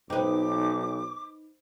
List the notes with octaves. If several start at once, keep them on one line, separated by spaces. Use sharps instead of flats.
B1 D4 D#4 B4 C5 G5 D6